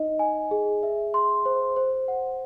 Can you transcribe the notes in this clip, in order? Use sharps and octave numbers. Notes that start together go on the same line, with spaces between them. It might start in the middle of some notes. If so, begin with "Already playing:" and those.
Already playing: D#4 D#5
G#5
G#4
E5
C6
C5
C5
F#5